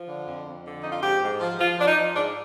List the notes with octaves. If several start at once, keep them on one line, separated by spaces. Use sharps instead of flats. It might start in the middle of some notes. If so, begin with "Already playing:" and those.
Already playing: F3
D3
F2
F2
D3
F2 D#4
F4
G#2 G4
G#2
F3
F3 F4
F3 D4
D#4
F3
G#2 D4